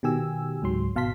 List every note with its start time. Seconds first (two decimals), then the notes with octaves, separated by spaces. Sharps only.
0.03 B2 D#3 G4 G#5 E6
0.62 C#2 G#2 F#3 C6
0.95 G#1 B2 F5 A5 C6 B6